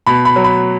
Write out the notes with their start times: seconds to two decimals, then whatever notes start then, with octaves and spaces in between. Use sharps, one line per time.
0.06 B2 B5
0.25 B5
0.36 F#3
0.44 B5